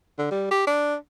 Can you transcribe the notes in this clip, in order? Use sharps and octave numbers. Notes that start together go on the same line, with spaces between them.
D3
G3
G4
D4